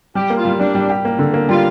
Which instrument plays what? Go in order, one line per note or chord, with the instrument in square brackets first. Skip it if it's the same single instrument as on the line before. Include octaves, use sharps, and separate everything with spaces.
[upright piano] G3 [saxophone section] G4
[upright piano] A#3
[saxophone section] F4
[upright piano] G3
[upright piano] G3 [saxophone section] D4
[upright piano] G3
G4
A#3
D3
A#3
[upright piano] G3 [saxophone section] F4